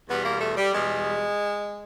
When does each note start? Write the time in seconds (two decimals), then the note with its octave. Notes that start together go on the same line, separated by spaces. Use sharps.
0.09 E2 B2 G3 B3
0.25 A#3
0.41 A3
0.57 G3
0.73 E2 B2 G3 G#3